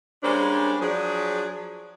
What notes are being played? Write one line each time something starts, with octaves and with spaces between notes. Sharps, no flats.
G3 G#3 A#3 C#4 D4 C5
F3 F#3 D4 G#4